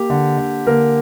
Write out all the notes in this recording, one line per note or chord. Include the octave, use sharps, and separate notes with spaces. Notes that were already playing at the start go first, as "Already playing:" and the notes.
Already playing: A#3 G4
D3
D3
D3 A#3 A#4